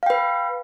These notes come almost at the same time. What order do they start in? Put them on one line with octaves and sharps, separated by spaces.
F5 G5 B4